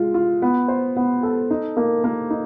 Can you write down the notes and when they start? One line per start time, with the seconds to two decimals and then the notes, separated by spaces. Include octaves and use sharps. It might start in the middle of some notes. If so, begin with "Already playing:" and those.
Already playing: G#3 F4
0.14 F4
0.42 B3
0.68 C5
0.97 B3
1.23 A4
1.51 D#4
1.77 A#3
2.04 A#3
2.30 D#4